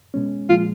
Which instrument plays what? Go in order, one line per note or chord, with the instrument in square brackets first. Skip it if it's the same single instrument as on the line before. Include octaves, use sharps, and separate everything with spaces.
[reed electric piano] B2 G#3 C#4
[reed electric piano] A#2 F3 G#3 [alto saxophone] F4